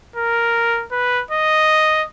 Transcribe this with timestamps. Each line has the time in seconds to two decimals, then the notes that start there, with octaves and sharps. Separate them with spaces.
0.16 A#4
0.92 B4
1.31 D#5